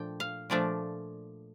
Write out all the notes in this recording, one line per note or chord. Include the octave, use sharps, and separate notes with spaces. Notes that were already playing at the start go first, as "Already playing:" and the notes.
Already playing: A#2 F3 A3 D4 G5
F5
A#2 F3 A3 D4 D5